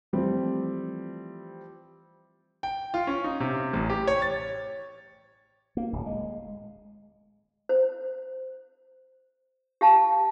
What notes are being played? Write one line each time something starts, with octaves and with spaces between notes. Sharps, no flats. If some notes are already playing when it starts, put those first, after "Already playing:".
E3 F3 G3 A3 C4 G4
G5
F4
C#4
D#4
C3
A1
G4
C#5
A6
A#3
D1
G#3
C5
G4 F5 A5